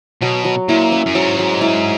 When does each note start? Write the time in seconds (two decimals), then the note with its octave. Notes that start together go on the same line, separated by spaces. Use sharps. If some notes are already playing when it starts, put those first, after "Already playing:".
0.21 B2 F#3
0.45 F#3
0.69 A#2 E4
0.92 C#4
1.06 F#2
1.15 G#2 F#3
1.39 F#3
1.61 E4